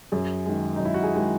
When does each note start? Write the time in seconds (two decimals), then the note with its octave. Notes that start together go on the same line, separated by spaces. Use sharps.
0.12 F#2 G#4
0.46 D#3 G#3
0.76 F#2 D#4
0.85 E4
0.94 F#4
1.03 G#4
1.14 D#3 G#3